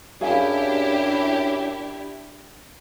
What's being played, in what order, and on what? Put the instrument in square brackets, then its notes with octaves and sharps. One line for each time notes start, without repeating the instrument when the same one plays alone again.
[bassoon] F#2 [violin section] D4 E4 G4 [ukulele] G#4 F5 G#5